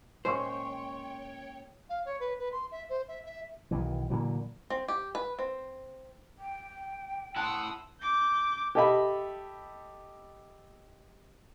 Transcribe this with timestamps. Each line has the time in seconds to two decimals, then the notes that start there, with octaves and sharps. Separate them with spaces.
0.25 A#2 G#3 C#4 C5 C#5 G5 C6 C#6
1.89 F5
2.05 C#5
2.20 B4
2.39 B4
2.52 C6
2.72 E5
2.89 C5
3.08 E5
3.26 E5
3.71 B1 D#3 E3
4.10 A#2 D3 E3 F#3
4.70 C4
4.88 G4
5.15 B4
5.39 C4
6.39 G5
7.36 E4 F#5 A5 C6 D#6 E6
8.01 D6 G6
8.75 G4 A4 D#5 E5 B5